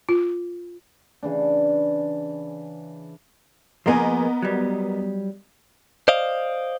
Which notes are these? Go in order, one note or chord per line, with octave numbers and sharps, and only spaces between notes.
F4
C#3 E3 D4
F3 A#3 B3 G#4 A#4 D#5
F#3 G3
C5 D5 D#5 F5